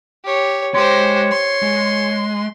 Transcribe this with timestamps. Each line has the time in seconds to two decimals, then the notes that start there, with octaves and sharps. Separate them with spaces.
0.24 G4 C#5
0.74 G#3 G4 C5 C#5 C6
1.31 C6
1.62 G#3